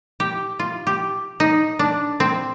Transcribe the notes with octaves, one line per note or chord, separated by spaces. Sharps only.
G4
F4
G4
D#4
D4
C4